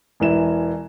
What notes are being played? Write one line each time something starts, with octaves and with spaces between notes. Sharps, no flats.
E1 E3 E7